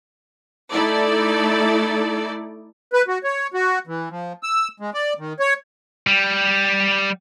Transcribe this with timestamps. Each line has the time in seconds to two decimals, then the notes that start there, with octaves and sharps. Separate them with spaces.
0.72 A3 D#4 E4 A4 D5
2.93 B4
3.08 F#4
3.24 C#5
3.54 F#4
3.87 E3
4.10 F3
4.43 E6
4.80 G#3
4.94 D5
5.18 D#3
5.40 C#5
6.07 G3